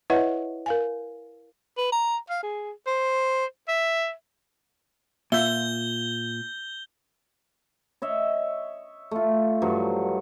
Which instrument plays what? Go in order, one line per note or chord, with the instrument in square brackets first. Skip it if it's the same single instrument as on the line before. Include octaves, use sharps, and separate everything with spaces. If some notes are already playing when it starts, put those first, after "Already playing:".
[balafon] E4 B4 C#5 D#5 E5 F#5
A#4 F5 G#5
[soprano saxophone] B4
A#5
F5
G#4
C5
E5
[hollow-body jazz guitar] A#2 [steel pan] F4 E5 [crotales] G6 G7
[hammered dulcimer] C#5 D#5 E5
A3 F4
G2 F3 F#3